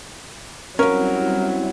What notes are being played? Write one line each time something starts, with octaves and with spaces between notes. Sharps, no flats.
F#3 G3 C4 C#4 E4 A#4 F5